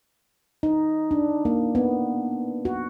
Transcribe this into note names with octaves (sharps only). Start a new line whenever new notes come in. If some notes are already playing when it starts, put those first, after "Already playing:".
D#4
D4
A#3
B3
F#4